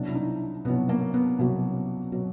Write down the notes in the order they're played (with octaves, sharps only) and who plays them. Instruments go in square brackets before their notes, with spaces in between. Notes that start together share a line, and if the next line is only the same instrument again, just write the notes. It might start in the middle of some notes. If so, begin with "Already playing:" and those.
Already playing: [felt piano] C2 B2 F#3 D4
E4
D#4
C2 B2 F#3 B3
A#3
B3
C2 B2 F#3 A#3
B2 F#3